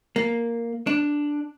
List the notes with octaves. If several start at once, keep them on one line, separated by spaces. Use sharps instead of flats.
A#3
D4